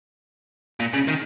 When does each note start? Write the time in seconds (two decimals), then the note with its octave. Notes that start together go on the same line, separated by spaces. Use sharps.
0.80 A#2
0.93 C#3
1.08 D#3